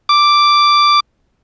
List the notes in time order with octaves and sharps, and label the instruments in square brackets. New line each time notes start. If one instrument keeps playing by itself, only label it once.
[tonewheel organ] D6